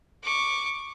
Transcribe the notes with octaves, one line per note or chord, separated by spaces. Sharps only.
C#6 D6